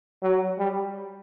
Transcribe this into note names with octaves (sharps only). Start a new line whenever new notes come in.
F#3
G3